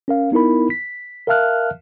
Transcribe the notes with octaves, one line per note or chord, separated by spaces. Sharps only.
C#4 A#4 F5
B3 D#4 E4 A#4 B5
B6
A#4 E5 F5 A5 F6 F#6